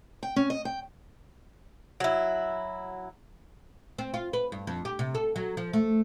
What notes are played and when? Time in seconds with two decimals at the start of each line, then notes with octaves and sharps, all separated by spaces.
0.23 G5
0.36 C#4
0.50 D#5
0.65 G5
2.00 F#3 E4
3.98 C4
4.14 F4
4.33 B4
4.52 G2
4.67 F2
4.85 G4
4.99 C3
5.15 A4
5.36 F#3
5.57 F3
5.73 A3